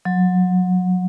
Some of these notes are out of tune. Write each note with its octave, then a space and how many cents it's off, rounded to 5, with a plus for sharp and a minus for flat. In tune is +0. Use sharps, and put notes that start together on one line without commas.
F#3 -25